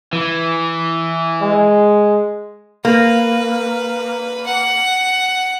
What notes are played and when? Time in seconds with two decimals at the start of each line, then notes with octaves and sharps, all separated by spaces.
0.13 E3
1.41 G#3
2.85 A#3 B4
4.46 F#5